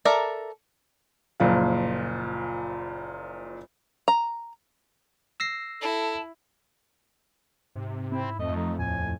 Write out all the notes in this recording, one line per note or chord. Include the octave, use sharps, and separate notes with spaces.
A4 A#4 D5 E5 A#5
F#1 A#2 F3 F5
A#5
E6 A#6 C7
E4 A4 A5
G#2 C3
C4 E4
F2 A3 D#5
F3 D#4
D#2 A2 G#5